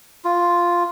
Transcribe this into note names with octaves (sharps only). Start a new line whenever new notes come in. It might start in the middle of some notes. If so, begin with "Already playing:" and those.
F4